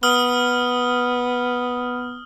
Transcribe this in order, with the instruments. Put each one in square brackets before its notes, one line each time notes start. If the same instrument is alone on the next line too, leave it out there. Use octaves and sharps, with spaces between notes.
[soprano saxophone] B3 [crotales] D#6 F6 G7